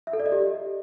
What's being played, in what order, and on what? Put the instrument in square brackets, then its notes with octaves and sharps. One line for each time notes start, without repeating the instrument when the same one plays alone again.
[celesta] E5
A4
D5
D#5
G4